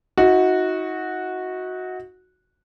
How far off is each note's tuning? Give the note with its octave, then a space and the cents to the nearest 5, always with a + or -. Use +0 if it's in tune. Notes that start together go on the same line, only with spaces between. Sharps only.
D#4 +40 F#4 -10